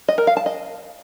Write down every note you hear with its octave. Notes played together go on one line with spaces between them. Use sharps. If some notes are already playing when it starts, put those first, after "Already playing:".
D#5
A#4
F5
A5
D#5